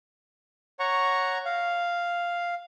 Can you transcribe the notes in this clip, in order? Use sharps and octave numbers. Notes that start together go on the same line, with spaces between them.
C#5 F#5 A#5 C#6
F5